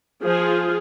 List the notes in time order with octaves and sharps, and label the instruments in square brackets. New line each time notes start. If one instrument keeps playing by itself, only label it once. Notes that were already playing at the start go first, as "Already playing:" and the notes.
[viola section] F3 F4 G#4